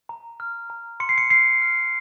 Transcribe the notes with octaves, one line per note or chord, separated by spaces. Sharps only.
A#5
F6
A#5
C6 C#7
C7
C#7
F6 C7
F6